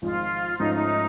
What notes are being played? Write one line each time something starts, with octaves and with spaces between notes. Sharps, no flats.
G#1 G#2 F3 G#3 F4
G#2 F3 A3 C#4 D#4 F4
D#4